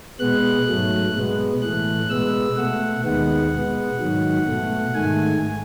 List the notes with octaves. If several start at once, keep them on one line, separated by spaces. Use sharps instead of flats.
B2 G#3 B3 F#6
G#2 F#3 A3
B2 G#3 B3
A2 E3 A3 F#6
B2 G#3 B3 E6
B2 A3 F#5
D#2 D#3 G#3 B3 F#5
B2 G#3 B3
G#2 D#3 F#3
B2 A3
G#2 D#3 A3 G#5